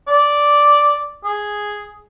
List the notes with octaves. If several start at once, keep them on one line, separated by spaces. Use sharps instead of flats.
D5
G#4